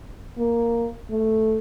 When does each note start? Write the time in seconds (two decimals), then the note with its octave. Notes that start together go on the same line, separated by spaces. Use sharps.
0.38 A#3
1.10 A3